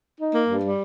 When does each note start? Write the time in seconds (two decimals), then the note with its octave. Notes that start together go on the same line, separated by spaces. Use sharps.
0.19 D#4
0.33 A#3
0.49 G2
0.63 G3